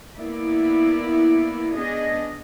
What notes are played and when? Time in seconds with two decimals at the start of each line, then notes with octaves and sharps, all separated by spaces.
0.15 A#3 B3 E4 D5
1.74 B3 D4 G#4 D#5